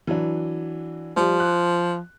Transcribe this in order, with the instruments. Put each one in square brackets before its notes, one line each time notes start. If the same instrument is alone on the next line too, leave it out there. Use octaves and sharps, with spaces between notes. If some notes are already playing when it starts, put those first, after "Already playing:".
[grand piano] E3 F#3 D4
[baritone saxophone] F3 [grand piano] G3
[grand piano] F#6